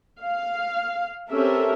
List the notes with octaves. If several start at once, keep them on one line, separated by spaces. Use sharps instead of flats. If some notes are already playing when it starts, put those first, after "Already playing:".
F5
C4 C#4 G4 A4 A#4 E5